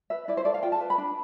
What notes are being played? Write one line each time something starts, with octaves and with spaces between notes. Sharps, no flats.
B4 E5
E4 D5
C5
A4 D5
F5
F4 G5
A5
B4
B5
D4